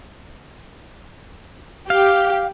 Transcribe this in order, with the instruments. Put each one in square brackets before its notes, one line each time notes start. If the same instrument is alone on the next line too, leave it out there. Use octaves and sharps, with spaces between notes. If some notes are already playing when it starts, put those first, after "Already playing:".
[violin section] G4 [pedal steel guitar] F5